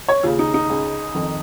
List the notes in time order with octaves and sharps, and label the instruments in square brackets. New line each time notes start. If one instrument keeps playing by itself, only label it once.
[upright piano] C#5
D#2 C#3 F4
D#4
D#4
C#2 C#3
F2 D#3